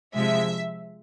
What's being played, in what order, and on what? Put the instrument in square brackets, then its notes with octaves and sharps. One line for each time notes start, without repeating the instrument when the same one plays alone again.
[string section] C3 F3 G#3 E5